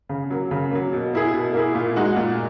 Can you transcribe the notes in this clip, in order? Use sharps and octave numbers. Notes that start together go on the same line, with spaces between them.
C#3
F#3 A#3
C#3
F#3 A#3
B2
A#3 E4 G#4
B2
A#3 E4 G#4
A#2
G#3 D#4 F#4
A#2